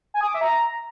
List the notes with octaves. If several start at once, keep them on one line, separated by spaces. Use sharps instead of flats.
G#5
D#6
D6
E5
A#5